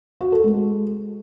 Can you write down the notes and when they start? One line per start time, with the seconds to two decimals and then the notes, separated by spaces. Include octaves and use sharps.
0.21 F#4
0.32 A4
0.44 G#3